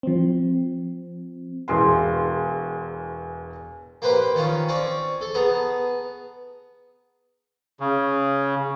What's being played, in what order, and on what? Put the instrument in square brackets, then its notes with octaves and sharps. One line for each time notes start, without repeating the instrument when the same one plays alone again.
[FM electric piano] F3 C4
[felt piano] E1 E2 C6
[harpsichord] A#3 G4 B4 C5 G5
D#3 C#4 F4
C4 C#4 C#5 D5
A4
B3 G#4 A5 A#5
[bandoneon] C#3